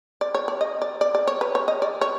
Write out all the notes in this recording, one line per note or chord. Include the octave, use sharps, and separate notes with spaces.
D5
C#5
D5
D#5
D5
D5
D5
C#5
B4
C#5
D#5
D5
C#5